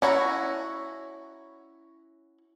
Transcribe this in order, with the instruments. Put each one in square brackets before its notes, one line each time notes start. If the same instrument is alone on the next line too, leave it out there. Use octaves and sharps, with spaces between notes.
[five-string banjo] C#4 E4 F#4 A#5